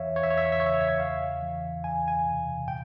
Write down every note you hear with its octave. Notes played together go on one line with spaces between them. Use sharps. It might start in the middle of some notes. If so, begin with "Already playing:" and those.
Already playing: E2 E3 C#5 E5 F5
E2 C#5
E5
C#5
E5
C#5
E5
C#3 C#5
E5
C#5
E5
C#5
E2 F5
E3
E2 G#5
G#5
C3
A#2 G5